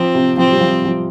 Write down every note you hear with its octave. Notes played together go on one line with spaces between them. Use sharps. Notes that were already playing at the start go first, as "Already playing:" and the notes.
Already playing: F3 C4
C3
F3 C4
G3
F3
F3